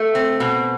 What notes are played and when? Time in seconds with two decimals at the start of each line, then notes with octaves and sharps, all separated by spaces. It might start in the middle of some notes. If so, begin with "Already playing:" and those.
Already playing: A3
0.15 C4
0.40 B2